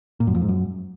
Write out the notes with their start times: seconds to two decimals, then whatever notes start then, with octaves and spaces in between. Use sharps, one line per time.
0.20 A#2
0.27 F#2
0.34 F2
0.42 G#2
0.49 F#2